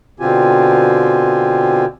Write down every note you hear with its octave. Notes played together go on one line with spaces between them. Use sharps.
B2 D3 C4 F4 G4 G#5